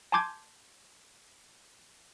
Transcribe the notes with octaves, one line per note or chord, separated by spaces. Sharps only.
G#5 A5 C6 D6 G6 G#6